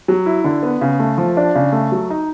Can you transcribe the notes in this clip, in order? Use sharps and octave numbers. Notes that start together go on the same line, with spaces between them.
F#3
E4
D3
B3
C#3
A3
F3
D4
C#3
A3
F#3
D#4